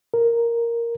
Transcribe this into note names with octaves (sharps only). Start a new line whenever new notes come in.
A#4